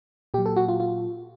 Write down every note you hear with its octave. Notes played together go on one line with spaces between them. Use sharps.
A#2 F#3 G4
A4
F#4
F4
F4